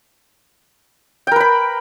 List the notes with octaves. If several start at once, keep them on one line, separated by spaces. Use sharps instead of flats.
A#4 B4 G5 B5